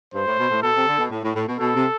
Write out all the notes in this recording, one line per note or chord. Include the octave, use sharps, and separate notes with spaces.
G2 C5
A2
B2
A2
B2 A4
C3
D3
B2
A2
A2
A2
B2
B2 A4
C3